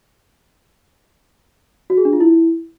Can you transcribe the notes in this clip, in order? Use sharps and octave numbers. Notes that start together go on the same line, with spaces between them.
F#4
G#4
D4
F4
E4